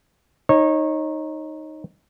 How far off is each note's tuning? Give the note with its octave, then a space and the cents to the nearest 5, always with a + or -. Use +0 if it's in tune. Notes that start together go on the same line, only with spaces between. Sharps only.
D#4 +0 C#5 -25